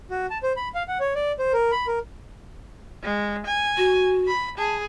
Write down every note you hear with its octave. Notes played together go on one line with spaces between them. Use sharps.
F#4
A5
C5
B5
F5
F#5
C#5
D5
C5
A#4
B5
A#4
G#3
G#5
F#4
B5
G#4 A5